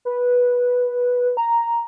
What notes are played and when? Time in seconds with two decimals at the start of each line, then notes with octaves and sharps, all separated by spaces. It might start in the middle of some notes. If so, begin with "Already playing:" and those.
0.05 B4
1.37 A#5